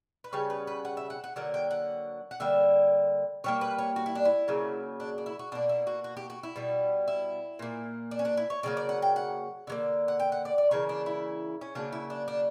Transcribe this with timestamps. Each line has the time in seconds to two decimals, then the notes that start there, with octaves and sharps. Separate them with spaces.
0.24 B4
0.33 C#3 G3 B3 C#5
0.50 B4
0.67 B4
0.85 F#5
0.97 E5
1.10 F#5
1.24 F#5
1.36 D3 F#3 A#3 F#5
1.54 G5
1.71 F#5
2.31 F#5
2.40 D3 G3 A#3 E5
3.44 D3 G3 A#3 C#5
3.61 B4
3.78 C#5
3.96 F#4
4.06 E4
4.15 D4
4.25 E4
4.48 C#3 F#3 A#3
5.00 D4
5.18 D4
5.26 E4
5.39 F#4
5.52 B2 A#3 D4
5.69 E4
5.87 F#4
6.04 F#4
6.17 G4
6.30 F#4
6.43 E4
6.56 B2 G3 B3
7.08 E4
7.59 A#2 A#3
8.11 D4
8.19 C#4
8.25 D4
8.37 E4
8.50 C#5
8.63 C#3 F#3 A#3 D5
8.77 D5
8.89 F#5
9.02 G5
9.16 F#5
9.67 D3 F#3 A#3
10.08 F#5
10.20 G5
10.32 F#5
10.45 D5
10.58 D5
10.71 C#3 E3 A#3 C#5
10.89 D4
11.06 E4
11.61 C#4
11.75 C#3 F#3 A#3 D4
11.92 E4
12.10 D4
12.28 D4